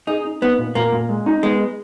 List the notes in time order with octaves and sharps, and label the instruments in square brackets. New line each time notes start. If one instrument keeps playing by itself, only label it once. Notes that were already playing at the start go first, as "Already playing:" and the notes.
[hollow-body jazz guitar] D#4 [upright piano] G#4
[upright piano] D#4
[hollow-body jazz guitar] B3 [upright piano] D#4
[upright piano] A#2
[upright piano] A#2 [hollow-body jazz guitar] A#3
[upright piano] A#2
G#3
D#4
[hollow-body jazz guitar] G#3 [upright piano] B3